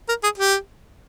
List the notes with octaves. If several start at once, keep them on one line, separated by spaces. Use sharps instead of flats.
A#4
G#4
G4